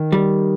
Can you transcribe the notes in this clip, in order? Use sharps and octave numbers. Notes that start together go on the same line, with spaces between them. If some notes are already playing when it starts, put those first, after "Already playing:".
Already playing: D#3
G3